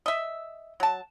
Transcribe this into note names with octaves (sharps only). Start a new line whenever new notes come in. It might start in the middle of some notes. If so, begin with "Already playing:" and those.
D#5 E5
F#3 A5